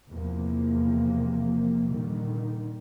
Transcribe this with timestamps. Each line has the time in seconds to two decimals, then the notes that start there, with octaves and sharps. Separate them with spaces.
0.11 E2 C3 F3 A#3
1.88 A#2 D3 D#3 G3